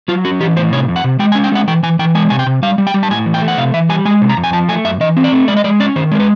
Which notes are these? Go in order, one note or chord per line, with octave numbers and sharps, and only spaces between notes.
F#3 F4
C#4 F#4
E3 G4
A2 C5
C3 C#5
F2
F#5
C3
G#3 G5
G#5
C#4
G5
G#3 F#5
E3 G5
E3 G#5
E3 G5
G#3 G#5
C3 G#5
G5
C3
G3 F5
G3
G5
G3
A5
A2 G#5
E3
G5
A3
F#5
C3 F5
E3 E5
G3 G#5
G#3 G#5
C3
A#5
F2
G#5
F3 A5
A3 G#5
F#2 E5
E3 D#5
C4
D5
A3
G#3 D5
D#5
G#3 D5
C#4 D5
D#3 C5
G#3 A#4
B4